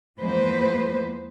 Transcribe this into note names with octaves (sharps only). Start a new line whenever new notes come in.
E2 F3 G#3 A#3 B4 C5